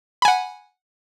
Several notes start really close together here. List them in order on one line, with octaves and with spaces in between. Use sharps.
B5 G#5 F#5